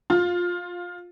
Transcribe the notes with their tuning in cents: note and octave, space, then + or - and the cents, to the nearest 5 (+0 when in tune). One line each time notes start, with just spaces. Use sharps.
F4 +15